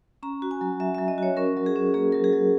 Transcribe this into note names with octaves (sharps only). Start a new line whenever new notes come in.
C#4 A#5
F#4
G#5
F#3
F#3 E5
F#3 E5
D#5
F#4 C#5
C#4 A#4
F#3
G#4
C#4
A#3 G#4
F#3 A#4
G#4
F#3